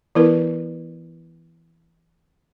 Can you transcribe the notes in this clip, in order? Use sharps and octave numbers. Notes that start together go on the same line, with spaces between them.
E3 B3 E4 A#4 B4